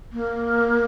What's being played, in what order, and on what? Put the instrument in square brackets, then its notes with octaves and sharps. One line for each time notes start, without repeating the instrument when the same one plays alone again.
[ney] A#3